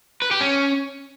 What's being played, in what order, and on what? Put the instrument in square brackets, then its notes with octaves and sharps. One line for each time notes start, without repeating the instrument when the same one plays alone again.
[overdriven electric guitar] B4
G4
C#4